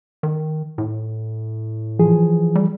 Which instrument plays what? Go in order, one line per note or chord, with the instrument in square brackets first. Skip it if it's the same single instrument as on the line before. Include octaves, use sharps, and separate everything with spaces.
[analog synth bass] D#3
A2
[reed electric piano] E3 F3 G#4
[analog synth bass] G3